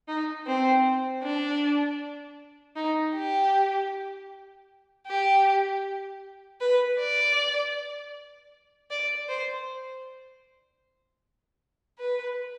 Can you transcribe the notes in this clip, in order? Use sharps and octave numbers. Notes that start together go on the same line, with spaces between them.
D#4
C4
D4
D#4
G4
G4
B4
D5
D5
C5
B4